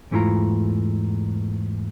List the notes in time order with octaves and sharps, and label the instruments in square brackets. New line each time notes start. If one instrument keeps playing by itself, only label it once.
[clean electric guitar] E2 G#2 A3 E4 F4 A#5